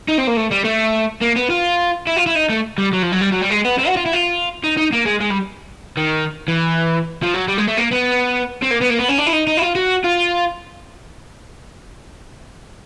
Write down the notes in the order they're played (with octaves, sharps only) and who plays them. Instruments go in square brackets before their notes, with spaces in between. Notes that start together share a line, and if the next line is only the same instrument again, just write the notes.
[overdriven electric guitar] D#4
C4
A#3
A3
G3
A3
A#3
B3
F4
E4
F4
E4
D#4
A3
G3
F#3
F3
F#3
G3
F#3
G3
G#3
B3
C4
F#4
F4
E4
F4
D#4
D#4
A#3
G#3
G#3
G3
D#3
E3
F3
F#3
G3
G#3
A3
A#3
B3
C4
A#3
B3
A#3
B3
C#4
D4
E4
D#4
D#4
E4
F4
F#4
F4